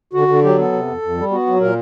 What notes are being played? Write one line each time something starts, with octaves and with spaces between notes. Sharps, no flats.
D3 F#4
D3
F#3 G4
B3 A4
C3
F2
F2
G3
B3 F#4
F#3
A#2 A#4